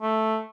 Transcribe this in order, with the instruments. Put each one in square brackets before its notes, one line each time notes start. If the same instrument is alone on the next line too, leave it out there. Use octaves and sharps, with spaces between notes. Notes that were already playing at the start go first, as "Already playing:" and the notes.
[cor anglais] A3